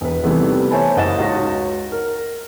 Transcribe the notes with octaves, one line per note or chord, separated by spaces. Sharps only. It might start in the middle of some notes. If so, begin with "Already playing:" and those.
E1 B4
C3 D#3 E3 G3 A3 B3
C5 C#5 E5 G#5 A5 B5
F#1 D#5 F#5 A6 E7
C#2 D#4 F#4 C#5 A#6
A#4